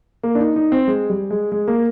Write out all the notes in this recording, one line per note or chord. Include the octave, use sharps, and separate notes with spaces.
A#3
D4
D#4
D#4
C4
G#3
G3
G#3
G#3
A#3